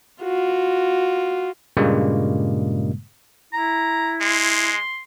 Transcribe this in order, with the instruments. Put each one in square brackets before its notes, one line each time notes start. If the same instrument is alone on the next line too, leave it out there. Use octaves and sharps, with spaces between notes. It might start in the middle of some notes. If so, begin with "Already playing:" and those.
[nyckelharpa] F4 F#4
[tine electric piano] G2 A#2 C#3 G3 G#3 A#3
[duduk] E4 [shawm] A#5
[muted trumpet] G#3 [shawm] C6